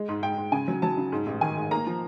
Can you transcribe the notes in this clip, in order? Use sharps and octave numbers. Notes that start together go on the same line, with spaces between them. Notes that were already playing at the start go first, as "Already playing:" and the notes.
Already playing: G#3
G#2
G#2 G5
G#2
C#3 G#5
F#3
F#3 A5
C#3
G#2
A1
D#3 G#5
G#2
A#3 A#5
F3